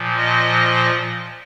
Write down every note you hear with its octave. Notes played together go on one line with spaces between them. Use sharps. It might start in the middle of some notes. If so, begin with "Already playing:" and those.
Already playing: A#2 F3
D#5